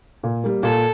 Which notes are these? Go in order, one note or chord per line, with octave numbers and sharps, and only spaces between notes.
A#2
G3 A#3
A#2 A4